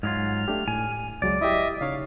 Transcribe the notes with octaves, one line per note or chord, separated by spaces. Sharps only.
G#2 F#3 F4 F6
A3 D4 G4
A2 G#5
C#2 F#3 G#3 D5
E4 G4 D#5 E5
C#3 D#4 C#5 F5